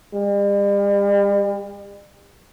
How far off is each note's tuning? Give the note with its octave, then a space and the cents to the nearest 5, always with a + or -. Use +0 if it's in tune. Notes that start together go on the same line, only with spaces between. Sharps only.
G3 +45